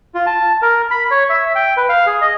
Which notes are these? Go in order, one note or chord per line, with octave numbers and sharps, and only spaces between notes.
F4
A5
A#4
B5
C#5
E5
G5
B4
F5
G#4
D#5